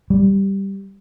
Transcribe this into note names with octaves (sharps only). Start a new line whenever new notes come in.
G3